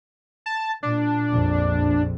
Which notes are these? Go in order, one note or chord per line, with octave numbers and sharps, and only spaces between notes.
A5
A#2 D4
A#1 F2 A#2